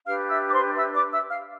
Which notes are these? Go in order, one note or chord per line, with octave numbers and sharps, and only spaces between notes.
D4 G4 B4 F5 F6
E5 E6
D6
C5 C6
E5 E6
D5 D6
E5 E6
F5 F6